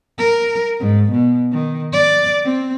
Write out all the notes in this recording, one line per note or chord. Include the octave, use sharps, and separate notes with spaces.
A#4
G#2
B2
D#3
D5
C4